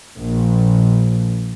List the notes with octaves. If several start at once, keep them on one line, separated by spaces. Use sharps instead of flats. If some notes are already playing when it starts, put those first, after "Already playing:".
A#1